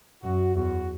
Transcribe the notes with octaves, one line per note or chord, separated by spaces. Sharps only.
F#2 F#4
E2 F#4